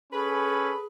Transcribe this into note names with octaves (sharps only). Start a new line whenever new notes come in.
C#4 G#4 A4 B4 B5